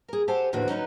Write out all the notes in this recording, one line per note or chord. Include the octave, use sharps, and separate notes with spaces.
G#4 A#4
G4 A4 C5 F#5 G#5 A5
D#2 A2 D3 F3 F#4 B4
F#3 C#4 D#4 B4